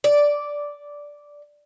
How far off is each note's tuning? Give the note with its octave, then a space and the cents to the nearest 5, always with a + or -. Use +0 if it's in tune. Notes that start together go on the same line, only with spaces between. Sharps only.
D5 -5